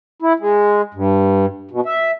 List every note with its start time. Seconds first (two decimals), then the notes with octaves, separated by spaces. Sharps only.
0.22 E4
0.39 G#3
0.94 G2
1.71 B2
1.86 E5